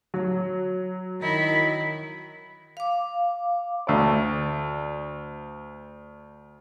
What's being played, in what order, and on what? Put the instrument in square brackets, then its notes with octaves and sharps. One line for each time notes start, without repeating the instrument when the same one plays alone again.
[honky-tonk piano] F#3
[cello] D#3 E4
[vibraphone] F5 D6
[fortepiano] D2 D5